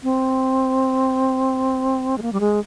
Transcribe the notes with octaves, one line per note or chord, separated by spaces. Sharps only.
C4
G#3
A#3
G3
G#3